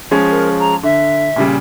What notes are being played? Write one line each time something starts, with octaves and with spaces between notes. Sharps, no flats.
F3 G#3 C#4
A#4
A#5
D3 E5
A#2 C#3 G3